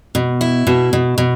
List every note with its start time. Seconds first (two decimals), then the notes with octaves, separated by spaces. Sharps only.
0.15 B2
0.41 E4
0.67 B2
0.93 B2
1.18 B2